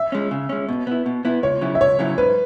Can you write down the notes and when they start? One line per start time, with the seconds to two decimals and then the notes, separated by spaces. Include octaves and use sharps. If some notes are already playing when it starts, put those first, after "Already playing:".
Already playing: E5
0.12 G#3 C#4
0.31 C#3
0.49 G#3 C#4
0.69 B2
0.87 B3 E4
1.06 B2
1.25 B3 E4
1.43 C#2 C#5
1.61 C#3 F#3 E4
1.75 E5
1.80 C#2 C#5
1.99 C#3 F#3 E4
2.18 G#2 B4